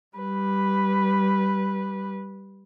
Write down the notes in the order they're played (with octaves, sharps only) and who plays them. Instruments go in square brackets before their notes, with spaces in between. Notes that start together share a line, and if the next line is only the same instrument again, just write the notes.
[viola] G3 B4